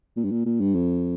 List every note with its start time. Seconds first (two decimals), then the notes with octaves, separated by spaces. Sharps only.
0.16 A#2
0.24 G2
0.31 A#2
0.46 A#2
0.60 G2
0.75 F2